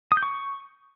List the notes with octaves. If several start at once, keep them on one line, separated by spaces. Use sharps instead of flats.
D#6
G6
C#6